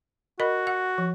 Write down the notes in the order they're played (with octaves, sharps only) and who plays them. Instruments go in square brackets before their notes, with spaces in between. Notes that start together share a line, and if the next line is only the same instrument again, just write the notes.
[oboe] F#4 [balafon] A#4 D#5 B5
[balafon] F#5
F3